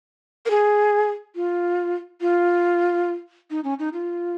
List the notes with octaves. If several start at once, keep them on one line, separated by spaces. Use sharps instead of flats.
A#4
G#4
F4
F4
D#4
C#4
D#4
F4